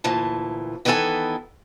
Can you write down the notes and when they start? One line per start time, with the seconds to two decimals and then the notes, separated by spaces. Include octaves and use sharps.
0.04 D2 A#2 E3 A5
0.85 D#3 E3 B3 C#4 A4 G#5